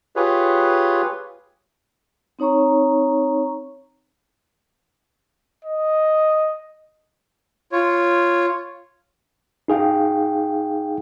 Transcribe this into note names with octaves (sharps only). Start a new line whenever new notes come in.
F4 G4 G#4 B4 C#5
C4 D#4 C#5 A#5 C#6
D#5
F4 C#5
D#4 G#4 F5 G5